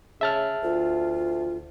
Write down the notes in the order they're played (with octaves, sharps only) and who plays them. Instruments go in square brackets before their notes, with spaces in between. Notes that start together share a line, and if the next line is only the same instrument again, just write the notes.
[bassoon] C#3 [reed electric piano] E5 A5 F6
[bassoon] D2 [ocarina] F4